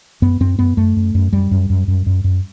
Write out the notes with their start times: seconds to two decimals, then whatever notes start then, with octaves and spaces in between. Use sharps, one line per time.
0.22 F#2 B3
0.40 F#2 C4
0.59 F#2 B3
0.77 F#2 A3
0.96 F#2
1.15 F#2
1.33 F#2 G3
1.51 F#2
1.70 F#2
1.88 F#2
2.06 F#2
2.24 F#2